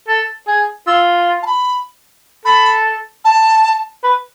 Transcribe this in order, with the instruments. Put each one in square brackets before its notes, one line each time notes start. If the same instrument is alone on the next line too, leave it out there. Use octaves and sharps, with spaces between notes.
[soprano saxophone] A4
G#4
[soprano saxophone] F4 [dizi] E6
[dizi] A5
B5
[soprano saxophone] A4 [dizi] B5
[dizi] A5
[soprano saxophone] B4